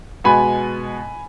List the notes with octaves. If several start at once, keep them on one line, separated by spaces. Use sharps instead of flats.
B2 G#3 B3 G#5 B5